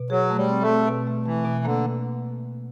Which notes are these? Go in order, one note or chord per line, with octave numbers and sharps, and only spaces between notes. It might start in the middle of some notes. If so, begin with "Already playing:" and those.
Already playing: B2
F#3 G#4
A3
G3
C4
A3
C4
B2
A3
E3 A3
B2
D3 A#3